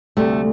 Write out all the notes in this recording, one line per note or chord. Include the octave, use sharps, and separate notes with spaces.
D2 C3 G3 A3